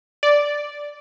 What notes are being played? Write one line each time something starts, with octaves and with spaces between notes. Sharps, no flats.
D5